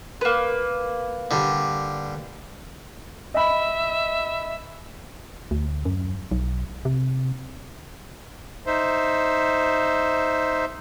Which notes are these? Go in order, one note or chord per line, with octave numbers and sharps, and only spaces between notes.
A#3 B4
D3 G3
D#5 E5 B5
D2
F#2
B1
C3
D#4 C5 E5